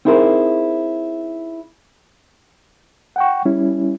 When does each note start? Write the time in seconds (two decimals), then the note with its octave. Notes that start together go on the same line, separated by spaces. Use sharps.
0.05 C4 D#4 E4 G#4 A#4 C5
3.16 F#5 G5 C#6
3.45 G3 C#4 E4